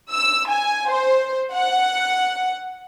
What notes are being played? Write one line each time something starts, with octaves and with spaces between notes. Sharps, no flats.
E6
G#5
C5
F#5